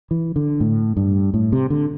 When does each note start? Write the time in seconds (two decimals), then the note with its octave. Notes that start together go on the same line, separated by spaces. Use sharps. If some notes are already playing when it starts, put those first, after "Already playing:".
0.11 E3
0.36 D3
0.60 A2
0.97 G2
1.34 A2
1.52 C3
1.70 D3